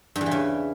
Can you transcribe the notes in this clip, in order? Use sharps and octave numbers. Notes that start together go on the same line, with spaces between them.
G2
E2
E3
C#3